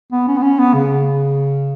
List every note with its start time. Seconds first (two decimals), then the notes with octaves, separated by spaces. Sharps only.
0.12 B3
0.27 C#4
0.36 B3
0.42 C#4
0.58 B3
0.74 C#3